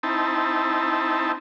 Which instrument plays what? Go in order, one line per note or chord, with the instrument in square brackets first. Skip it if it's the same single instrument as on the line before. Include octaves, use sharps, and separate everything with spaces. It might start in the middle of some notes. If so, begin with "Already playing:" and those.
[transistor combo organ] C4 D#4 E4 A5